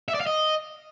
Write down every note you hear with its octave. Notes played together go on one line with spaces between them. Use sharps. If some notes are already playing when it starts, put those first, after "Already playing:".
E5
D5
F5
D#5